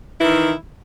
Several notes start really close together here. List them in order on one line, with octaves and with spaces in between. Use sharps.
E4 E3 D#3